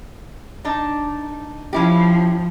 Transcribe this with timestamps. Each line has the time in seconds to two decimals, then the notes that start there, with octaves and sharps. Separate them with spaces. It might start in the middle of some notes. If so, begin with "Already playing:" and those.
0.64 D4 D#4
1.73 F3 C#4 E4 G4